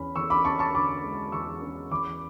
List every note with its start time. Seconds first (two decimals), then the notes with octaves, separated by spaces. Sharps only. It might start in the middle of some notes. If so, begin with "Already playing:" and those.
Already playing: E2 C#4 B5
0.16 E2 C#6 E6
0.30 B5 D6
0.45 C#4 A5 C#6
0.59 A5 C#6
0.74 D3 B5 D6
1.03 G#3
1.32 E2 C#6 E6
1.62 C#4
1.91 E2 B5 D6